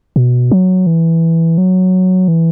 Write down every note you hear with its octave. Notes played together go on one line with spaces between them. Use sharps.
B2
F#3
E3
F#3
E3